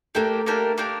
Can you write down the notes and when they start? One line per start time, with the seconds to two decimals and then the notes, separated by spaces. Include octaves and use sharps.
0.15 A3 A#3 D4 G4 A#4
0.46 A#3 D4 G4 A#4
0.78 A#3 D4 G4 A#4